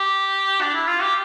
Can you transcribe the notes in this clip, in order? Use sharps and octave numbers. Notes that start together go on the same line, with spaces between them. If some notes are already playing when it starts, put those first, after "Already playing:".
Already playing: G4
D4
E4
F4
G4